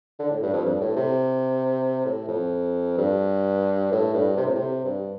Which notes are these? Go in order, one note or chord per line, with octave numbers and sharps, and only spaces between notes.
D3
A2
G2
F2
G2
A2
C3
A2
F2
G2
A2
G2
C3
A2
C3
G2